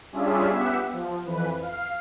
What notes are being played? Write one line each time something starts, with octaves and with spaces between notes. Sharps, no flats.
G3 C#4 D4 F4 G#4 E5
B3 G4 E5 F#5
F3
F2 E3 B4
F5